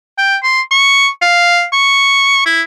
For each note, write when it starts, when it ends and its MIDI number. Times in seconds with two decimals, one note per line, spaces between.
0.18 0.36 79
0.43 0.61 84
0.71 1.08 85
1.21 1.65 77
1.73 2.44 85
2.46 2.61 64